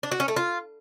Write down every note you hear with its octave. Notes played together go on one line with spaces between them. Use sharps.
D4
F#4
C#4
A3
F4